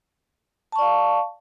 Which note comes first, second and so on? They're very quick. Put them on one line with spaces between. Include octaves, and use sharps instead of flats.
A5 C#6 D5 F5